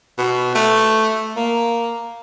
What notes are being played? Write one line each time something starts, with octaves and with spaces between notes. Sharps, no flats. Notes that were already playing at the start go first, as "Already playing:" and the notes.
B2
A3
A#3